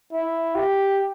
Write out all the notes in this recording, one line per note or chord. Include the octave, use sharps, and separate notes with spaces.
E4
G4